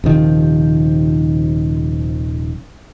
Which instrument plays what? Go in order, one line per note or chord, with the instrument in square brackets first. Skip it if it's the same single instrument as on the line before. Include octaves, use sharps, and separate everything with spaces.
[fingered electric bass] D#1 C3 D#3 F3